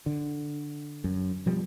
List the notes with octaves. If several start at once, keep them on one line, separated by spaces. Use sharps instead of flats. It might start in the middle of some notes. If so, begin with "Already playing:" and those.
D3
F#2
B2 F3 G3